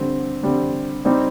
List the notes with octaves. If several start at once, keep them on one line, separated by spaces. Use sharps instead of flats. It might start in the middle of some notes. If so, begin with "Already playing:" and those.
Already playing: D3 G3 C4
D3 G3 C4
G3 C4 D#4 G4